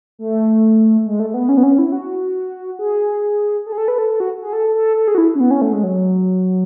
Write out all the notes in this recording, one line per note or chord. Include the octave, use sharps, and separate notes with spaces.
A3
G#3
A3
A3
B3
C#4
B3
C#4
E4
F#4
G#4
A4
G#4
A4
B4
A4
A4
F#4
G#4
A4
A4
A4
G#4
F#4
E4
C#4
B3
C#4
A3
G#3
F#3